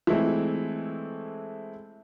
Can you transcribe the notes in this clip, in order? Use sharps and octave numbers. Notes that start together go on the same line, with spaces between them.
E3 G#3 A3 C4